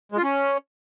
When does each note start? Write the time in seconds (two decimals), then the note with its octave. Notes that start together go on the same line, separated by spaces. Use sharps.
0.12 G#3
0.17 F4
0.23 C#4